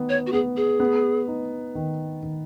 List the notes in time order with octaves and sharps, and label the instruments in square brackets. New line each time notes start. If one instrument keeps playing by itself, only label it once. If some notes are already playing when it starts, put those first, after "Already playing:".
Already playing: [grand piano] D#3 B3
[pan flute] C#5
F#4
[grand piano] B3 [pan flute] G#4
[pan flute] G#4
[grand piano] B3
D#4
D#3
D#3